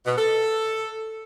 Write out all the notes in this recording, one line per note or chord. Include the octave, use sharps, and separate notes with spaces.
B2
A4